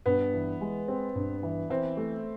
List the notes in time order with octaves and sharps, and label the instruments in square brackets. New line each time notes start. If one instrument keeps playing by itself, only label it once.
[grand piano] G2 [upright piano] B3
[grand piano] E3
G#3
C4
G2
E3
[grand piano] E3 [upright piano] C4
[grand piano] A3